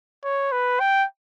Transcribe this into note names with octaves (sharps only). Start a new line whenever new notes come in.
C#5
B4
G5